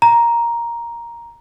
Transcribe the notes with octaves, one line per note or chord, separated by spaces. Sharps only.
A#5